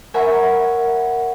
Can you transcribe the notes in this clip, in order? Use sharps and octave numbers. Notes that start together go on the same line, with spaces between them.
A#4 C#5 E5 F#5 G#5 B5